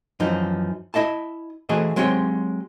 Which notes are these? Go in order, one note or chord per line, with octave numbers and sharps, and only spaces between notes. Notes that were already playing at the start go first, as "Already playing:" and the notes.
F#2 E3 F3 D#4
E4 D#5 E5 A5
E3 A3 F#4 G#4 C5 D#5
F#3 G#3 C4 G4 C#5